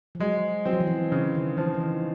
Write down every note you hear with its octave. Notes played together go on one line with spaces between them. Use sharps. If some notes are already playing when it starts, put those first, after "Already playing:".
F3
F#3 G#3
F#3 C4
F3
E3
F3
C#3 E3
D#3
E3 F3
D#3
E3